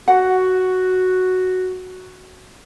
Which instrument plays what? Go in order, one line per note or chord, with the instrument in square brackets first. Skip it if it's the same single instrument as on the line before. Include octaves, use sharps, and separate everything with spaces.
[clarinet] F#4 [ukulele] F#5